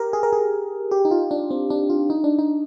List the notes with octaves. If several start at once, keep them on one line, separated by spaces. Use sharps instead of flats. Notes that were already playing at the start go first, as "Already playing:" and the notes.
Already playing: G4 A#4
G#4
A#4
G#4
G4
D#4
F4
D4
C4
D4
F4
D#4
D4
D#4